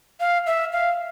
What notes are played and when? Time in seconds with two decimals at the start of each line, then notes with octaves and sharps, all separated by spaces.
0.20 F5
0.46 E5
0.72 F5